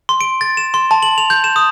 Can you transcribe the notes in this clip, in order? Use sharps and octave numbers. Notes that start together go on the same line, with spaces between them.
C6
D7
A6
E7
C6
A5
F#7
F7
G6
E7
D#6